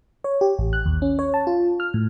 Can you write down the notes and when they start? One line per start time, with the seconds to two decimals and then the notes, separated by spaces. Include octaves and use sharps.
0.24 C#5
0.41 G4
0.58 A1
0.73 F#6
0.86 D#2
1.02 C#4
1.19 C#5
1.34 A5
1.47 F4
1.80 F6
1.94 A2